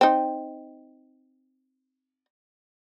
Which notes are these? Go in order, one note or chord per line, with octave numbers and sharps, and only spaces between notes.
C4 D#4